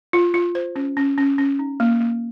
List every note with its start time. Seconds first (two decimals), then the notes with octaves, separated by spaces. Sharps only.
0.13 F4
0.34 F4
0.55 C5
0.76 C#4
0.97 C#4
1.18 C#4
1.38 C#4
1.59 D#4
1.80 A#3
2.00 A#3